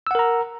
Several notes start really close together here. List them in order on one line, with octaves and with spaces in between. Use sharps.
E6 F#5 A#4 A#5